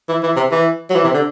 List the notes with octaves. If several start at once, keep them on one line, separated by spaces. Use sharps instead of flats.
E3
E3
C3
E3
F#3
E3
C3
D3